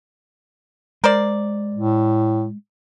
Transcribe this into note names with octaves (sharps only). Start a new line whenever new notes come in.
G#3 A#4 C5 D5
A2